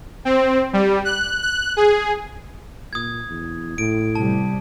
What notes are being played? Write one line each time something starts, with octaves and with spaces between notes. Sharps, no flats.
C4
G3
F#6
F#6
G#4
A#2 D#6 G#6
E2
A2 D7
C3 G3 A5